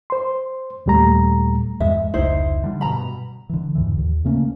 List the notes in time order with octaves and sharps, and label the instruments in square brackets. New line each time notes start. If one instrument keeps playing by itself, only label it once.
[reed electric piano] C5 C6
D#2 A#2 G3 A3 A#5
[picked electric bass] E2 G2 G#3 [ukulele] E5
[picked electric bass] F1 C#2 [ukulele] D#4 E4 C5
[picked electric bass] D3 G3
[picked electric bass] G2 B2 [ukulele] A#5 B5
[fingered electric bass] D3 E3
E2 G#2 D3 E3
D#2
C#3 A3 A#3 C#4